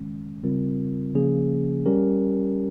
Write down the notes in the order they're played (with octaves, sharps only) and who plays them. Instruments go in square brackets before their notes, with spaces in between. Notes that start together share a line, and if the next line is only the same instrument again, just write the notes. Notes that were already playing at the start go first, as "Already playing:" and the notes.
Already playing: [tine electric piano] D#3 G#3 C#4
C#3 G3 C4 F4 A#4
C#3 F3 A#3 C#4 G#4
G3 C#4 G4 A#4